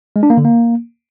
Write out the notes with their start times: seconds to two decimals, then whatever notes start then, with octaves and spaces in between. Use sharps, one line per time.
0.16 G#3
0.23 D4
0.30 A#3
0.37 D3
0.44 A#3